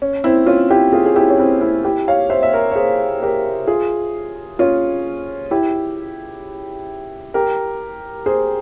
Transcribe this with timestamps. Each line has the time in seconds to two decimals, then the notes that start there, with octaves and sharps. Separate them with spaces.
0.02 C#4
0.24 C4 E4
0.46 C#4 F4
0.70 E4 G4
0.93 F4 G#4
1.06 G#4
1.16 E4 G4
1.30 C#4
1.39 C4 E4
1.61 C4 E4
1.85 E4 G4
2.08 C#5 F5
2.30 C5 E5
2.43 E5
2.53 A#4 C#5
2.71 C#5
2.76 G#4 C5
3.23 G4 A#4
3.67 F4 G#4
4.59 C#4 F4
5.51 E4 G4
7.34 G4 A#4
8.26 G#4 C5